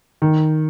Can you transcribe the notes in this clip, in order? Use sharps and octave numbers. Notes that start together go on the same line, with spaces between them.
D#3